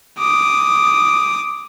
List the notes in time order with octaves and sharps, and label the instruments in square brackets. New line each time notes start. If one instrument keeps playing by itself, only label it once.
[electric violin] D6 D#6